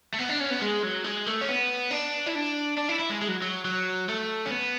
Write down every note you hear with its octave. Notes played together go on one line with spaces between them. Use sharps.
A3
B3
D4
C#4
B3
G#3
F#3
G#3
A3
C#4
B3
D4
E4
D4
D4
E4
E4
G#3
G#3
F#3
F#3
F#3
A3
C#4
B3